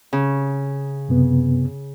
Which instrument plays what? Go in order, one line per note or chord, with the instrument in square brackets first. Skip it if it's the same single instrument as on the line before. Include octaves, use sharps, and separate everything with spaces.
[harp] C#3
[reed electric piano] F#2 C3 B3